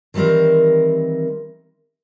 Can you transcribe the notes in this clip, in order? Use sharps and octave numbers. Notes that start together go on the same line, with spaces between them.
D#3 E3 G3 C4 A#4